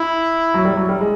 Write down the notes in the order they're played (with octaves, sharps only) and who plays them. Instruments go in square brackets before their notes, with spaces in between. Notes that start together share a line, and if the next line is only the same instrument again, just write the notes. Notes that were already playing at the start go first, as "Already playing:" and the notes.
Already playing: [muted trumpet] E4
[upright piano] F#3
G3
F#3
G3
G#3